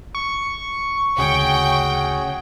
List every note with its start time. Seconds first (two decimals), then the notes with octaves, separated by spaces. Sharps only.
0.15 C#6
1.18 D2 C#3 C#4 F#4 G#4 G5